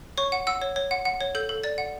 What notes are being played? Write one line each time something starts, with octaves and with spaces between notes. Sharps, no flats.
C#5 C#6
F#5
F#5 E6
C#5
C#5
F#5
F#5
C#5
A4 G6
A4
D5 A6
F#5